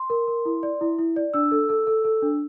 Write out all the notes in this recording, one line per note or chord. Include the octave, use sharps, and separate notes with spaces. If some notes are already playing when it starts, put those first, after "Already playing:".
Already playing: C6
A#4
A#4
E4
D5
E4
E4
D5
D4 E6
A4
A4
A4
A4
D4